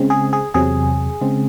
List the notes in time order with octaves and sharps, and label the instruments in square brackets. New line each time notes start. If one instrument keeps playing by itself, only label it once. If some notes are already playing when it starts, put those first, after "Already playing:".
Already playing: [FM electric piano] C#3 G#3 C4
G#4
G#4
E2 C3 F#3 G#4
C#3 G#3 C4